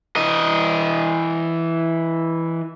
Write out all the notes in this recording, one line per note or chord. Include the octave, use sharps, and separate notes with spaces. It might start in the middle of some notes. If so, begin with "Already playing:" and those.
E3 D#5